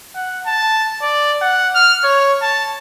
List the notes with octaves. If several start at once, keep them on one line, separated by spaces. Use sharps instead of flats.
F#5
A5
D5
F#5
F6
C#5
A5